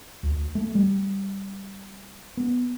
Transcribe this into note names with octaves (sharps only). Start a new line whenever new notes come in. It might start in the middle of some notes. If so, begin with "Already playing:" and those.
D2
A3
G3
B3